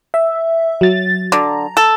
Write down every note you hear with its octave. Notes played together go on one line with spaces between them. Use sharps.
E5
F#3 A6
D3 A#5
A4